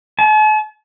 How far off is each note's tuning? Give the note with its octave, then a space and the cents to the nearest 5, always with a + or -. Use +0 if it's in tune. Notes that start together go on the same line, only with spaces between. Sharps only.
A5 -45